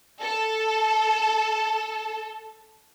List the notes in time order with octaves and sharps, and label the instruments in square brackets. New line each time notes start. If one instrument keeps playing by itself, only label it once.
[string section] A4 A5